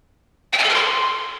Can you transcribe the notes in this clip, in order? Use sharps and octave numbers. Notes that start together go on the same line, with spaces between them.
G5
G#5
A4
A#4
C6